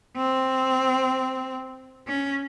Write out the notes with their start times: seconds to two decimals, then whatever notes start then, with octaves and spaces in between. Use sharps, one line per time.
0.17 C4
2.08 C#4